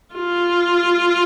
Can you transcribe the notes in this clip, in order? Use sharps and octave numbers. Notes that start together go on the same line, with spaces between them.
F4